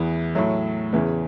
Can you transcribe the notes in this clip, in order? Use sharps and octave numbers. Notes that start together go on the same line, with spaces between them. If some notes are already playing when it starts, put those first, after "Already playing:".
Already playing: E2 E3 B3
A2 F#3 A3
E2 C#3 E3